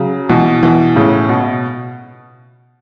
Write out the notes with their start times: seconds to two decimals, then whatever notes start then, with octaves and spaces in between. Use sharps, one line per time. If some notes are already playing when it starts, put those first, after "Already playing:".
Already playing: C#3 F#3
0.29 B2 E3
0.63 B2 E3
0.96 A2 C#3
1.29 B2